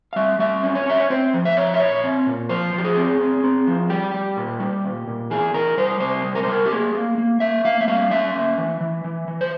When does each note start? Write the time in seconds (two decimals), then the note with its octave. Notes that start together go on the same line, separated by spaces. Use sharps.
0.13 F5
0.16 G3 E5
0.39 G3 E5
0.63 C#4
0.75 C#5
0.86 C#4 E5
1.00 C#5
1.10 C4 C5
1.34 F3
1.45 E5
1.57 F3 C#5
1.74 E5
1.80 A#2 C#5
2.04 C4
2.27 A#2
2.49 F3 C5
2.74 F3 G4
2.84 G#4
2.97 C4
3.20 C4
3.44 C4
3.67 F3
3.90 G3 G4
4.14 G3
4.37 A#2
4.60 G3
4.84 A#2
5.07 A#2
5.30 E3 G#4
5.54 E3 A#4
5.78 G3 C5
6.00 C3 C5
6.24 G3
6.35 A#4
6.43 C5
6.47 G3 A#4
6.65 G4
6.71 A#3 G#4
6.95 A#3
7.18 A#3
7.40 A#3 E5
7.65 A#3 F5
7.81 E5
7.87 G3 F5
8.11 C#4 E5
8.35 A#3
8.58 E3
8.81 E3
9.04 E3
9.28 E3
9.41 C5